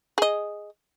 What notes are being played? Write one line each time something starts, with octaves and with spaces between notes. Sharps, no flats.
G#4 D#5